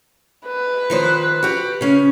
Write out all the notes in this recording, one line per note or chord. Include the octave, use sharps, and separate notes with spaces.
B4
D#3 F3 C5
F#4 G4
C#3 C#4